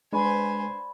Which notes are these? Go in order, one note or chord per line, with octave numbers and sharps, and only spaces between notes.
G#3 D4 B4 C5 D5 G#5 B5 C#6